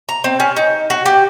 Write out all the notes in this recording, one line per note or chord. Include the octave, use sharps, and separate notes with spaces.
A#5
C4
C#4
D#4
F#4
G4